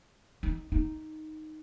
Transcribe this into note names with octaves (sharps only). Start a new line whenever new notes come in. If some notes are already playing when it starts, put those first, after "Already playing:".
D#4
D#4